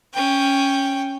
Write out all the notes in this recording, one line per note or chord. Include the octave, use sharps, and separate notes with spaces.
C#4 G5